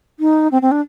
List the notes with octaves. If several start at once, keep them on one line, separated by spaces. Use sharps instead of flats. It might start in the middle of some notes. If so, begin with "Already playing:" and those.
D#4
C4
C4
D4